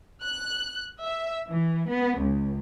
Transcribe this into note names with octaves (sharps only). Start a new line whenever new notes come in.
F#6
E5
E3
B3
C#2